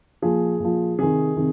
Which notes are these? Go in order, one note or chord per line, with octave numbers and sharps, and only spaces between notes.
A#2 F3 G#4
A#2 F3
C3 D#3 G#4
C3 D#3